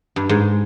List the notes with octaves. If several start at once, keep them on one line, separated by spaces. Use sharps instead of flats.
G2
G#2